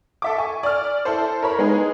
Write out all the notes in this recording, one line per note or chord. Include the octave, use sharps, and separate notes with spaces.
A4 E5 D6
G#5 C#6
D5 F6
E4 A4 C5
A#4 C#5 B5
G#3 B3 D#4 G#4